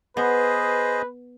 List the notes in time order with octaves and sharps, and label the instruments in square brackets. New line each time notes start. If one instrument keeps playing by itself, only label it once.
[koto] B3 [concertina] G#4 C5 D#5 [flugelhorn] B4